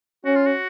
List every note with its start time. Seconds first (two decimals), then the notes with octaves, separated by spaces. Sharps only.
0.25 C#4 F#4
0.36 F4
0.46 F#4